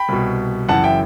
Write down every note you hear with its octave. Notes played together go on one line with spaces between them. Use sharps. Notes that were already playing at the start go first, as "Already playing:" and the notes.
Already playing: G5 B5
C2 B2
F#1 F#2 E3 F#5 A5
E5 G5